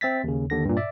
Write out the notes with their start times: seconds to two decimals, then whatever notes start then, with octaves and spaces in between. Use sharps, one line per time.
0.01 C4 E5 A6 B6
0.24 D#2 C#3
0.50 D#2 D3 A#6
0.65 G2 A#2
0.77 D5 E5